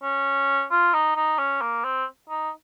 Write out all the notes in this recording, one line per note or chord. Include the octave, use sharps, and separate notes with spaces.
C#4
F4
D#4
D#4
C#4
A#3
C4
D#4